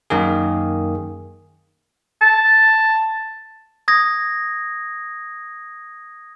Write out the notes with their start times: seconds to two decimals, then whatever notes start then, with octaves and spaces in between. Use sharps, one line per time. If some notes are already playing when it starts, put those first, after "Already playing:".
0.10 F#2 D#3 A#3 G#4
2.22 A5
3.88 D#6 G#6 A#6